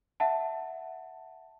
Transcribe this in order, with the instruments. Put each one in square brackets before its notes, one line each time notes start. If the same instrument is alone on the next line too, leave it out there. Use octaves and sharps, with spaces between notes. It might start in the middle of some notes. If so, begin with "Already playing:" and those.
[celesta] E5 F#5 A5